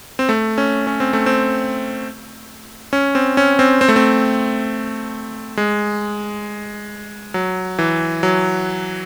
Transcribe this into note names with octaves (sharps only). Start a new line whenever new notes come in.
C4
A3
C#4
C#4
C4
A3
C4
C#4
C4
C#4
C4
C4
A3
C4
G#3
F#3
E3
F#3